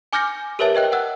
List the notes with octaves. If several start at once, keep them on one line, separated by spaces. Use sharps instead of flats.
G#5 D6 F6 G6 A#6 C#7
G4 A#4 B4 C#5 E5 A5
B4 D#5 G5 F#6
F#5 E6 F#6